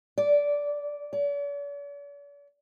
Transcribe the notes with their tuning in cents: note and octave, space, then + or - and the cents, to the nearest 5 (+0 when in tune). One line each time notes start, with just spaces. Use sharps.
D5 -15
D5 -45